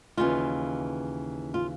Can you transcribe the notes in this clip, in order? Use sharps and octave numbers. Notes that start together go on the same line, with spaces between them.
D#2 C#3 E3 F4
F4